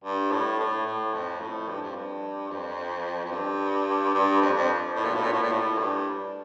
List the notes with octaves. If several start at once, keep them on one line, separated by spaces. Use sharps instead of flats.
G2
A2
A2
A2
F2
A2
G2
F2
G2
F2
F2
G2
G2
F2
F2
A2
A#2
A2
A#2
A2
A#2
A2
G2